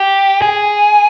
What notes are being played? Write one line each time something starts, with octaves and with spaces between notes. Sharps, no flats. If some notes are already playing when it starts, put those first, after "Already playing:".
Already playing: G4
G#4